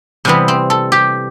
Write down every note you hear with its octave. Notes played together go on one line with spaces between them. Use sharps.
C3 E3 G3 B3
C4
A4
G4